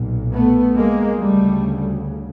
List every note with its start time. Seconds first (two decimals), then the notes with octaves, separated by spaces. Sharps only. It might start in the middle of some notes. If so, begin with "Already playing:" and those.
Already playing: B1 A#2
0.33 A3 B3
0.76 G#3 A#3
1.19 D2 C#3 G3 A3